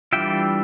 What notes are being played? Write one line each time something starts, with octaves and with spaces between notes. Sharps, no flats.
E3 G3 D4 F4 E5 G5